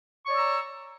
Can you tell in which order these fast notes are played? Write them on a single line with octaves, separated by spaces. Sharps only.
C#6 C#5 D5 E6 A#5